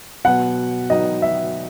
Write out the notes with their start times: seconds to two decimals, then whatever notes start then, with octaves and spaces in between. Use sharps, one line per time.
0.24 B2 F#3 B3 F#5
0.90 F#3 B3 D#4 D#5
1.22 E5